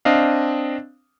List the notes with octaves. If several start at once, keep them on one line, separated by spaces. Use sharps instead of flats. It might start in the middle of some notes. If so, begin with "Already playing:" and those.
C4 D4 D#5 F5